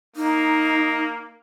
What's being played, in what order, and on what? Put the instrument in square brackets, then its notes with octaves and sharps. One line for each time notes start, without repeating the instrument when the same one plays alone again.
[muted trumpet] A#3 [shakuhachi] D#4